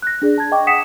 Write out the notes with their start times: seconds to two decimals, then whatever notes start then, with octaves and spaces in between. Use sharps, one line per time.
0.02 F#6 A#6
0.22 D4 G#4 D5
0.38 A5 G#6
0.52 D#5 G5 C#6 D6
0.67 F#5 G5 D#6 B6 C#7 E7